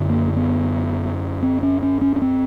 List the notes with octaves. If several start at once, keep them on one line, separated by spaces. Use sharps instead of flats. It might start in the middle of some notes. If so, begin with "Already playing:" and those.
Already playing: F#2 D3
A#3
B3
C4
C#4
C#4
C#4
C#4
C4